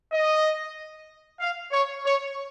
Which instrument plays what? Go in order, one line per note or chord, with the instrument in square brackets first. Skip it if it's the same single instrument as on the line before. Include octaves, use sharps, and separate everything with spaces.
[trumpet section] D#5
F5
C#5
C#5